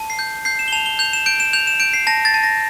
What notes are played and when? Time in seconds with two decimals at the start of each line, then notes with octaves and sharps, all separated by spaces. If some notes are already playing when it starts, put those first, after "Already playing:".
Already playing: A5
0.10 C7
0.19 G6
0.45 G6 C7
0.59 E7
0.68 G7
0.72 A5 F7
0.86 G7
0.99 G6 F7
1.13 E7
1.26 G6 D7
1.40 E7
1.53 G6 F7
1.67 E7
1.80 G6 D7
1.93 C7
2.07 A5 A#6
2.25 A6
2.34 A5
2.43 A#6